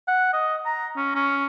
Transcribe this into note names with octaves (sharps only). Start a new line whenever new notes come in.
F#5
D#5
A#5
C#4
C#4